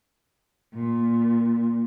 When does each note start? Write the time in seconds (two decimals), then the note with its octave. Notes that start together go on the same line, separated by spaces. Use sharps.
0.74 A#2